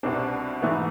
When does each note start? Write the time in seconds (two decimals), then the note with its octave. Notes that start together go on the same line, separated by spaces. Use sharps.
0.03 C2 B2 C4 D4
0.62 G#2 E3 A3 B3